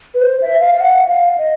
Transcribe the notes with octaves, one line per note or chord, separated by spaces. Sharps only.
B4
C5
E5
F5
F5
F#5
F5
D#5